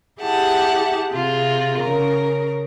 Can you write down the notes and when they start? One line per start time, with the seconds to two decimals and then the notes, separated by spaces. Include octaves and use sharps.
0.21 E4 G4 G#4 F#5 A5
1.14 C3 F4 G#4
1.79 C#3 A#4